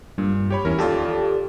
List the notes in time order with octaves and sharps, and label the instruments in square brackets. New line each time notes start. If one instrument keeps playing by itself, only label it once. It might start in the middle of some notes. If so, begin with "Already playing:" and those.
[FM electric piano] G2 [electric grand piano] A#2
[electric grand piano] G4 C#5 B5
[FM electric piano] E2 [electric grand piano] C#4 E4 A#4
[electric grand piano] D#2 F4 [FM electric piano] G4 A4 D5